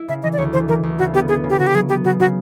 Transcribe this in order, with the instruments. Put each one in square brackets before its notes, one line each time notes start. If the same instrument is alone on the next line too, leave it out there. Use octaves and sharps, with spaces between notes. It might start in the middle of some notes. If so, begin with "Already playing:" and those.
Already playing: [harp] E4
[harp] C#3 [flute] E5
[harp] E3 [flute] D#5
[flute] D5
[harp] D2 [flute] C#5
[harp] E3 [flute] C5
[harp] E3 [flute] A#4
[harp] D2
[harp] C#3 [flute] F#4
[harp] B3 [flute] G4
[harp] B3 [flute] G#4
[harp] C#3
[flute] G4
[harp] C#3 [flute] F#4
[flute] G4
[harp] F#3 [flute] G#4
[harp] B3 [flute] G4
[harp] C#3 [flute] F#4
[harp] C#3 [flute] F#4